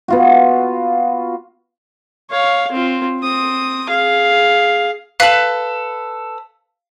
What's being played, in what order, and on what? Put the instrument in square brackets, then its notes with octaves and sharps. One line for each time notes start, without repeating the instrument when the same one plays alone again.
[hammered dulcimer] B3 F4 F#4
[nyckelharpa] C#5 F5
C4 F4
C4 D#6
G#4 F5
[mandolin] A4 B4 [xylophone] F5 F#7